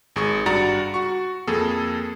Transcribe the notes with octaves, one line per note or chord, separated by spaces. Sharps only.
G#1 G#4 C#6
G2 F#4 D5 A#5 A6 C#7
F#4 C#6
F2 A#3 G#4 A4